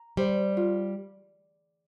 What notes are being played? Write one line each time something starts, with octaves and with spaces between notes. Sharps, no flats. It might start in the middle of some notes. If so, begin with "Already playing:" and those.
Already playing: A#5
G3 C5
F4